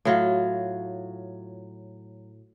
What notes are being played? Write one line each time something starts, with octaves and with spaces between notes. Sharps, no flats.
A2 F#3 F4